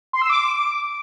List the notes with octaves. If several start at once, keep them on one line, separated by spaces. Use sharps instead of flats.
C6
E6
D6